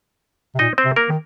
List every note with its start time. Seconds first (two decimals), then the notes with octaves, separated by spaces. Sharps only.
0.55 C3
0.59 A#2 D#4 D#5
0.78 C4 C5
0.85 C3
0.96 A#3 A#4
1.09 D#3